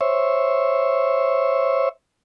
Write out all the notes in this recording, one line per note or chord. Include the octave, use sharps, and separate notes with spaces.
C5 C#5 E5